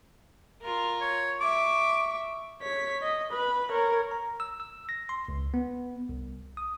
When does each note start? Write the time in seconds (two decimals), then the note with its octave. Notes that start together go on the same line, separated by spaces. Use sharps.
0.62 F4 A#4
1.01 C#5
1.41 E5 C#6 D6
2.62 C#5 B6
3.02 D#5
3.33 B4 B5
3.71 A#4 C#5
4.11 A#5
4.40 E6
4.60 E6
4.89 A#6
5.09 C6
5.28 C#2
5.54 B3
6.09 C2
6.57 D#6